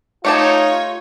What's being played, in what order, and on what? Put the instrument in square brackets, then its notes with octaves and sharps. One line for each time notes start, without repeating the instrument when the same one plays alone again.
[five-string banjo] A3 G4 A5 [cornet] D#4 [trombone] F4 [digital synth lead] C#5